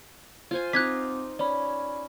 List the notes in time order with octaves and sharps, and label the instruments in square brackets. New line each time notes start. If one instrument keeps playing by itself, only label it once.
[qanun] F4 C5 G#5
[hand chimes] C4 D6 [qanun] D#4 F4 [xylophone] F#6 G#6 B6
[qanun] C#4 [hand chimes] D5 B5